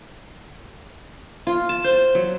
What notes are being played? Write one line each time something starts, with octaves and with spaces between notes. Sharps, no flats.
F4
A5
C5
F#3